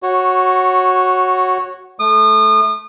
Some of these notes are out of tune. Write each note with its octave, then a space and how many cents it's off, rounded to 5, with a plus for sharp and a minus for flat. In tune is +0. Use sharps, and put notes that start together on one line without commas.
F#4 +0 C#5 -15
A3 -15 D#6 -35